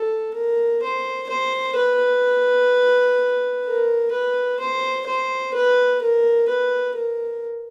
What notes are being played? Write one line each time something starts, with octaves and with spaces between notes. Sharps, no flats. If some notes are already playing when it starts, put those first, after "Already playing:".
Already playing: A4
A#4
C5
C5
B4
A#4
B4
C5
C5
B4
A#4
B4
A#4